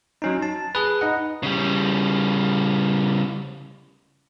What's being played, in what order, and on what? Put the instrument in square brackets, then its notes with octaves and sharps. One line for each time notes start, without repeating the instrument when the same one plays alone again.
[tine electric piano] F#3 C#4 D#4
A5
G#4 B4
D#4 D#5 F#5
[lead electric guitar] C#3 G3